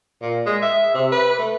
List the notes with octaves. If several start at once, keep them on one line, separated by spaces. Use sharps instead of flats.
A#2
G#3
E5
C3
B4
A3